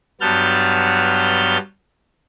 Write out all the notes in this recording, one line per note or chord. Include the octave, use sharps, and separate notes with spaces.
G2 F#3 B3 A5 F6 G6